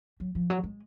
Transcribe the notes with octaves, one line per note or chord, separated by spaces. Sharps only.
F#3
F3
F#3
G#3